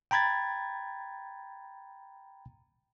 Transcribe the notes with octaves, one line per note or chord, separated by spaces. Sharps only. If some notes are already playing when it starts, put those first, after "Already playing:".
G5 A#5 B5 G#6 A6